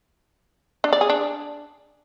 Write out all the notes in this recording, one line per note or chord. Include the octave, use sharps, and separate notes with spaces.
D4
D5
G#4
D4